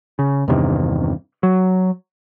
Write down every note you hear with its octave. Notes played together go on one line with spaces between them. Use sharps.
C#3
E2 G2 C3 D#3
F#3